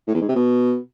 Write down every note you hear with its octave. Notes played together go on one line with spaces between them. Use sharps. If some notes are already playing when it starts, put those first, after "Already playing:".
A2
E2
G#2
C3
B2